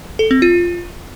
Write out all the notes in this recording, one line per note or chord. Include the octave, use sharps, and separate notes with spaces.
A4
C4
F4